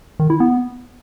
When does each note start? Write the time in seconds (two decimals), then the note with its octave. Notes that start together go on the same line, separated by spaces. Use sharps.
0.20 D#3
0.30 E4
0.40 B3